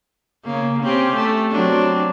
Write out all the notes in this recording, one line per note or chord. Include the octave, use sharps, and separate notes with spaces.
C#3 A#3
C4 C#4 G4
A3
F#3 C4 D4